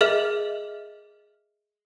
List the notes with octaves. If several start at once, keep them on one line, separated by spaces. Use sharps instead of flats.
G#4 A#4 D#5 E5 F6